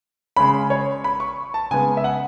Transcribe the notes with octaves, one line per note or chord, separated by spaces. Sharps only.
C#3 G#3 C#4 B5
C#5
B5
C#6
A5
C#3 G#3 B3 G#5
E5
F#5